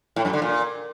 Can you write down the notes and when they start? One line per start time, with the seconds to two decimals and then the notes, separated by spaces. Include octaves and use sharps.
0.16 A2
0.25 F#2
0.33 D3
0.42 A#2